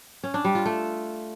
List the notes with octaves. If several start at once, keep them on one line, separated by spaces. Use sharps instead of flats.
C#4
D4
G3
F4
A3